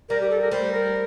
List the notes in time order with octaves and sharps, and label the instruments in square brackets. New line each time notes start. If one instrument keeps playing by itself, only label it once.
[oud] G3 [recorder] A#4
[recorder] G4
A4
A#4
[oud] G3 [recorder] C5
[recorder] A#4